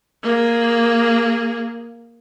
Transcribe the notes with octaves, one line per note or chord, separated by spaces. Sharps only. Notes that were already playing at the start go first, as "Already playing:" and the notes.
A#3 G#4